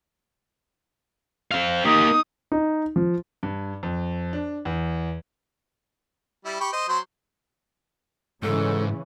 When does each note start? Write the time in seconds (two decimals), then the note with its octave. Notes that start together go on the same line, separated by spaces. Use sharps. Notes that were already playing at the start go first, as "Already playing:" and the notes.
1.51 C4 F5
1.85 A#3 D#4 G4 D#6
2.52 D#4
2.96 F3
3.43 G2
3.83 F2
4.33 D4
4.65 E2
6.45 G3 E4
6.60 G4 B5 C#6
6.73 C5 D#5
6.88 F#3 C5 C6
8.43 G#2 C#3 E3 C#4 A4